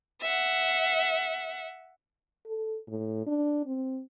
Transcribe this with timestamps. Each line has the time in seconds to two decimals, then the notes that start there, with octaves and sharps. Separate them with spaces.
0.21 E5 F#5
2.46 A4
2.88 A2
3.27 D4
3.66 C4